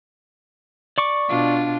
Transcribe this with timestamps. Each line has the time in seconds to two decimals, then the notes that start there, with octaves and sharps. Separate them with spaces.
0.98 D5 C#6 D6
1.29 B2 D4 F4